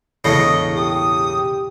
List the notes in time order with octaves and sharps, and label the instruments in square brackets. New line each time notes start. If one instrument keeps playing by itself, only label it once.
[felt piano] E1 E3 C7 [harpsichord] A2 C#3 A3 [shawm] D#5
[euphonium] G4 [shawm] D#6